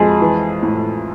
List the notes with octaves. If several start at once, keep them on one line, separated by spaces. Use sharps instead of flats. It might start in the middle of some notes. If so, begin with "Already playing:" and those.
Already playing: F2 G#3 G#4
E3
A2